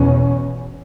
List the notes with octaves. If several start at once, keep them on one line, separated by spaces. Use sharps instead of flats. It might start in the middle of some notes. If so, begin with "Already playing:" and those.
Already playing: E2 B2 C#4